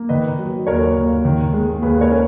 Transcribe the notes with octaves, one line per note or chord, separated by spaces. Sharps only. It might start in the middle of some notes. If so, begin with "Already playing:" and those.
Already playing: A#3
D#3 B4 D#5
F#3
D#2 A#4 C#5
D#2
D#3
G#3
D#2 G#4 B4
A#4 C#5
C#4